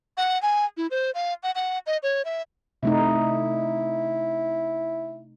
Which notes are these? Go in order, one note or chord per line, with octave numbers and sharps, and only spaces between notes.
F#5
G#5
E4
C5
F5
F#5
F#5
D#5
C#5
E5
C3 A3 D#4 E4